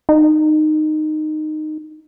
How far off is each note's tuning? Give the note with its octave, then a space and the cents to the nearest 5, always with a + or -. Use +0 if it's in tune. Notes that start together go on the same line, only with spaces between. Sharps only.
D#4 -15